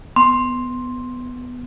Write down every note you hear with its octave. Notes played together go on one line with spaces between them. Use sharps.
B3 C6